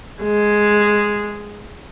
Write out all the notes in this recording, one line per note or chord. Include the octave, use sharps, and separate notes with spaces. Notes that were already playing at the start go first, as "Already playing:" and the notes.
G#3